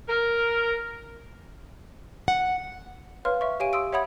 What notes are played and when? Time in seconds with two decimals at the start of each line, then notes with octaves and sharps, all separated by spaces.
0.09 A#4
2.28 F#5
3.25 B4 C#5 F5 C6 F6
3.41 E5 C#6
3.60 G4 C#5 F5 G#5 D7 D#7
3.73 C6 D#6 E6 D7
3.93 C#5 E5 F#5 B5 D#6 G#6